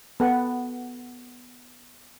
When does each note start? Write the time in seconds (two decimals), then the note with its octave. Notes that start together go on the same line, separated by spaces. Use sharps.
0.20 B3 A4 F#5